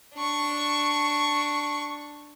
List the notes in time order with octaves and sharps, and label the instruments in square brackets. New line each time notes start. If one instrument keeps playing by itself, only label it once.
[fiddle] D4 C#6